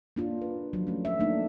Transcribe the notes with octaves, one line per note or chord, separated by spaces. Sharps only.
A#3 D4 F4
B4
F3 F#3
A3 C#4
E5
A3 A#3 D4 D#4